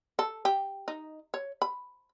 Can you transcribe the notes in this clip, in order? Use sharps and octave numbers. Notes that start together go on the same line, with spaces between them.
A4
G4
D#4
C#5
B5